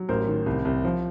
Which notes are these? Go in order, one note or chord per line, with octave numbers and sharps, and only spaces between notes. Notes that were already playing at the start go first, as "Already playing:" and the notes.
Already playing: F#3
A1 A#4 C5
D#3
C2
C2
F3